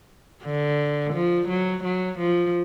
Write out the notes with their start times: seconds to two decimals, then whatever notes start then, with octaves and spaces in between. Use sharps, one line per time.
0.43 D3
1.14 F3
1.49 F#3
1.84 F#3
2.19 F3